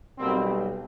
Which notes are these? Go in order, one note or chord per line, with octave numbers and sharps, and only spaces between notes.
B1 B2 G3 A#3 C4